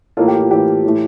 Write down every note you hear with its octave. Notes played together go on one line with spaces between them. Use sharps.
A2 E3 A#3 F4 A4
G4
F4
A2 E3 A#3 G4
A2 E3 A3